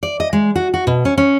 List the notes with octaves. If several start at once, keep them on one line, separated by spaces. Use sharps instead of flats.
D5
D#5
G#3
F#4
F#4
B2
C#4
C#4